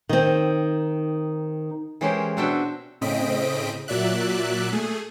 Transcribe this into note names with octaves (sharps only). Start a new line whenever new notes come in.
D#3 C4
E3 G#3 C#4 G4 A#4 C5
B2 C4 D4 F#4 E5 G5
A2 C#3 C4 D#5 B6 D7
A#2 F#3 D5 E5 F#6
A3 G#4